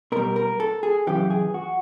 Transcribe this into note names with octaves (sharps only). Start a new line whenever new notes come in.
B2 G3 A#4
A#4
A4
G#4
F#2 C#3 E3 G4
G#4
F#4